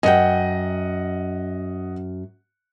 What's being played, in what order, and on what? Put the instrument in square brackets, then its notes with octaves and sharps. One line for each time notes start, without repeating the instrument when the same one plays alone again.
[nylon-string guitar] F#2 G5 [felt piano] D#5 F#5